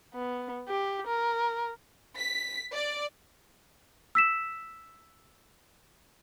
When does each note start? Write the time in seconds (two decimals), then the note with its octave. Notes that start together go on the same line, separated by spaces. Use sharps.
0.14 B3
0.68 G4
1.07 A#4
2.17 B6
2.72 D5
4.15 E6 B6 E7